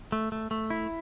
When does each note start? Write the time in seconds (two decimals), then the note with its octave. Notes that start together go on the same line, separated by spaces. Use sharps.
0.12 A3
0.32 A3
0.51 A3
0.70 E4